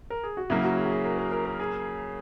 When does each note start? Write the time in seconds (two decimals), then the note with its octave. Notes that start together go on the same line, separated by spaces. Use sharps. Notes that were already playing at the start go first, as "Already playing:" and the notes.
0.10 A#4
0.24 G#4
0.37 F#4
0.50 C#3 F#3 A#3 E4
0.64 F#4
0.77 G#4
0.85 F#4
0.90 G#4
1.04 A#4
1.18 A#4
1.32 A#4
1.45 A#4
1.60 G#4